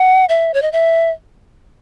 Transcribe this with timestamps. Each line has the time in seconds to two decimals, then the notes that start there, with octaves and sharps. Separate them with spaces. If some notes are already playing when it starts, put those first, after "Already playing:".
Already playing: F#5
0.29 E5
0.54 C#5
0.62 D#5
0.72 E5